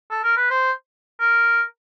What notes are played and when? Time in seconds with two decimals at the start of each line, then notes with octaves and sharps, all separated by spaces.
0.10 A4
0.24 A#4
0.37 B4
0.50 C5
1.20 A#4